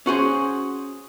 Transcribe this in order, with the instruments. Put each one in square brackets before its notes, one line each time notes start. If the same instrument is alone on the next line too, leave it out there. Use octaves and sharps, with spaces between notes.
[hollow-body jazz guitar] C#4 F#4 G#4 C5